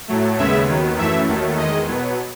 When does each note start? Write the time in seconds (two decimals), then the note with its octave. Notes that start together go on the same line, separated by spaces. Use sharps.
0.08 A2 F#3 A3
0.38 D#2 C#3 G#3 B3 E5
0.67 D#2 D#3 F#3 B3
0.98 F#2 E3 A3 E5
1.28 D#2 D#3 F#3 A3
1.58 E2 D#3 G#3 D#5
1.88 B2 F#3 B3